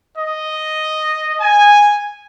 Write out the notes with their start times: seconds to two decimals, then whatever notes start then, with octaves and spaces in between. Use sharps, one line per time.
0.16 D#5
1.40 G#5